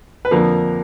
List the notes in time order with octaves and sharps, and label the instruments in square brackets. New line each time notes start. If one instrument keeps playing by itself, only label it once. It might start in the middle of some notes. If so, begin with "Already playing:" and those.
[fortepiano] B4
F2 D3 F3 A#3 A#4